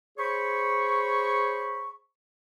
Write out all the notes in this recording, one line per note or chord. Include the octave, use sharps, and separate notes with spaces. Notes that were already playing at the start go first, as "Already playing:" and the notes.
G#4 C5 C#5 B5 C#6